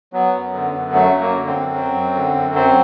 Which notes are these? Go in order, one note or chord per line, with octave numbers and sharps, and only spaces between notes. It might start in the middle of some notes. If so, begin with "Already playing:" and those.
F#3 B3
F#2
D3
F#2
F#3 A3
F#2
A#3
D3
C4
F#2
F#3
F#2
D3
F#2
F#3 C4